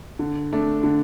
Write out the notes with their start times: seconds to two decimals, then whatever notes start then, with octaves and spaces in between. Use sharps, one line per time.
0.19 D3
0.52 A3 D4
0.83 D3